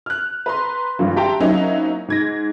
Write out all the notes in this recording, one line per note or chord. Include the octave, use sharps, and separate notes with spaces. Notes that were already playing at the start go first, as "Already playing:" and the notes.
F6 F#6
B4 A#5 C6
G#1 G2 F3
G4 E5 G5 A5 A#5 C6
F#3 A#3 C4 C#4 D#4 E4
G#2 G#6 A#6